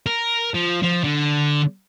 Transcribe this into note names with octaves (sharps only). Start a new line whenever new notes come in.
A#4
F3
F3
D3